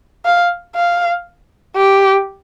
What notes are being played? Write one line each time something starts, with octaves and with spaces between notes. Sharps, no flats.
F5
F5
G4